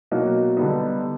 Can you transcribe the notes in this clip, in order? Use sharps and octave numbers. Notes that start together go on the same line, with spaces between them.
B2 F#3 A#3 D#4 F#4
D3 G3 B3 D#4